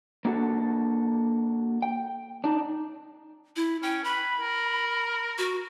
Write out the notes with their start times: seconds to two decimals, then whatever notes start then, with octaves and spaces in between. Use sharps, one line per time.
0.25 A#3 D4 F#4 A4
1.82 G5
2.44 D4 D#4
3.56 E4
3.83 C#4 G5
4.04 B4 B5
4.40 A#4
5.38 F#4